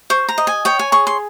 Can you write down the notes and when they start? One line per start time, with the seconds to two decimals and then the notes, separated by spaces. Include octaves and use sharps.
0.10 C5 C#6
0.28 A#5
0.38 D#5
0.47 G#5
0.65 C#5 G5
0.79 G#5
0.92 G#4 C#6
1.07 C6